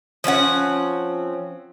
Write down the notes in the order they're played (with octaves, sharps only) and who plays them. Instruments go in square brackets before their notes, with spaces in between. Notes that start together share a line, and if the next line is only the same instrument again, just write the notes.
[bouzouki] F3 C4 C#4 F#5